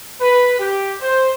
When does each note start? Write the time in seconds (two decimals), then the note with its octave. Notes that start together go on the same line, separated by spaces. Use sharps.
0.21 B4
0.59 G4
1.01 C5